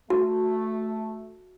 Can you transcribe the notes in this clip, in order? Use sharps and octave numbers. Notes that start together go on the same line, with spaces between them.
A3 F#4